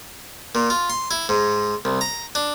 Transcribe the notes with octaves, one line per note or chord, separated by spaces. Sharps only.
A#2
F4
C6
E4
G#2
C2
A#5
D4